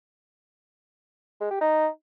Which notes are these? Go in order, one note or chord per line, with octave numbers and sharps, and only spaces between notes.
G#3
G4
D#4